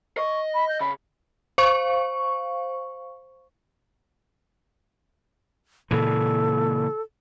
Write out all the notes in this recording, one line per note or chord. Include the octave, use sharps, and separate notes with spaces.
D#5 C#6
B5
G6
C#3 B5
C5 F5 C#6
A#2 C#3 E3 A4